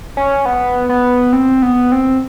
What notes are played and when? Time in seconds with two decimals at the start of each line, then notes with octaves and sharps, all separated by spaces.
0.17 C#4
0.46 B3
0.89 B3
1.33 C4
1.62 B3
1.92 C4